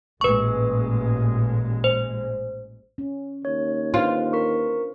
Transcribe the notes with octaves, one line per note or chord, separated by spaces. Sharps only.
A1 A#2 G#3 B4 C#6
C5
C#4
D#2 C#5
D4 F4 B4 C5
A#4 C#6